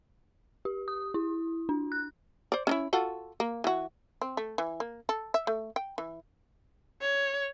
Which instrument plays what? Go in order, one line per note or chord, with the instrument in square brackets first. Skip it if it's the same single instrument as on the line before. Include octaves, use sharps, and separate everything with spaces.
[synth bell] G4
D#6
E4
D4
F#6
[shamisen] C5 D5
C#4 D#4 E4
F4 F#4 A4
A#3
E3 F#4
C4
A3
E3
A#3
A4
E5
A3
G5
E3
[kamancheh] C#5